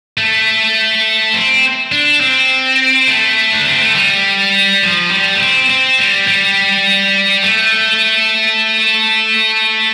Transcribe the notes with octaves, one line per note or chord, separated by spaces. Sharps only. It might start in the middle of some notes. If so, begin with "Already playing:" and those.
A3
C4
D4
C4
A3
D4
C4
A3
G3
F3
G3
A3
C4
C4
G3
G3
A3